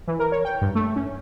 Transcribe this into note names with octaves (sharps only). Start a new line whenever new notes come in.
E3
A#4
C#5
G5
G2
A3
C#4